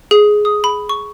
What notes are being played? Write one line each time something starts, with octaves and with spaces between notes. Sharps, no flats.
G#4
D#6
B5
C#6